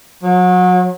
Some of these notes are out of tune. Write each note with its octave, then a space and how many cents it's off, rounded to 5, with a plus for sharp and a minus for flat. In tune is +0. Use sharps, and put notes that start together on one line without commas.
F#3 -35